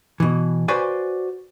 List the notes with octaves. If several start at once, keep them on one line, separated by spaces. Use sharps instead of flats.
B2 E3
F#4 B4 C5 D5 G#5